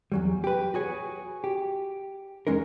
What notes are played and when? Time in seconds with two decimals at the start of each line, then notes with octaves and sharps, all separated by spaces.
0.12 E2 F#3 G3
0.44 G4 B4
0.74 F#4 G#4 C#5
1.44 G4
2.47 E2 G#3 C#4 D#4 A#4